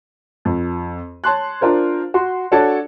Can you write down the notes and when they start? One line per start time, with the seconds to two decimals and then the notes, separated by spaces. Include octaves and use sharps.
0.45 F2
1.24 C#5 A5 C6 F#6
1.61 D4 F4 A#4 C5
2.14 F#4 C6
2.52 D4 F#4 A4 C#5 D5 A5